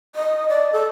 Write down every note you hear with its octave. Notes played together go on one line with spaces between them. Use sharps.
D#5
D5
A4